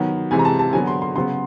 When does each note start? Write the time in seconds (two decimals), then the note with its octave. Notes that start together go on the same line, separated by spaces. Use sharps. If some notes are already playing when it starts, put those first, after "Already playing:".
Already playing: D#3 F#3 B3
0.31 C3 E3 G#3 G#5
0.39 A#5
0.45 A5
0.59 A5
0.73 D3 F#3 B3 G#5
0.87 C6
1.02 C6
1.16 C#3 F#3 B3 C6